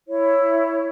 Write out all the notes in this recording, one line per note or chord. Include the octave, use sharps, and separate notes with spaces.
E4 C#5